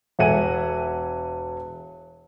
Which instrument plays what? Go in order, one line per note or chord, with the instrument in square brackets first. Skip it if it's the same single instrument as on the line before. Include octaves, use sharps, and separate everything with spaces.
[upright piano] E1 A4 E5 F#5 G#5 D#7